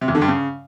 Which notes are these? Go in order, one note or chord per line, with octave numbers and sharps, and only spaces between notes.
C3
E2
D3
G2
C#3